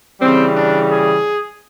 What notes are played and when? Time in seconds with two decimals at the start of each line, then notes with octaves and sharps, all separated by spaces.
0.20 C#3 E3 G3 C4
0.54 D4
0.89 G#4